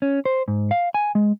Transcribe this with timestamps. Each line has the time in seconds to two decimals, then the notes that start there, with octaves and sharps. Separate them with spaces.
0.02 C#4
0.25 C5
0.48 G#2
0.71 F5
0.94 G#5
1.15 G#3